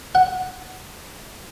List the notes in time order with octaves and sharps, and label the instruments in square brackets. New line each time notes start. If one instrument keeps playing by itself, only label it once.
[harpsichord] F#5